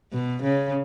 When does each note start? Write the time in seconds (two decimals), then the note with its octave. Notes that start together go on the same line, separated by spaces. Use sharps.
0.13 B2
0.43 C#3